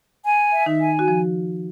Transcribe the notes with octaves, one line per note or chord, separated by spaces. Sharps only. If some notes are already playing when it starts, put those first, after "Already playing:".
G#5
E5
D#3 D#4
G#5
F#4
F3